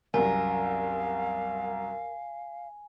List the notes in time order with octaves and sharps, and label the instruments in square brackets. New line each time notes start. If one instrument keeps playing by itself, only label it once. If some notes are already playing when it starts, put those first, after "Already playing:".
[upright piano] C2 F#2 [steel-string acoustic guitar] A#4 [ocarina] F5 [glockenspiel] G#5